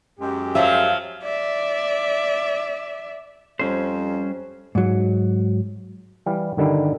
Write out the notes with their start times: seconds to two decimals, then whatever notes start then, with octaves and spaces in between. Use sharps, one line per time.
0.20 F#2 G#3 G4
0.55 F3 F#3 E5 F5
1.23 D5 E5
3.59 F2 G3 C#4 C5
4.75 G#2 F#3
6.26 E3 G3 F5
6.57 G2 D3 D#3 G3 E4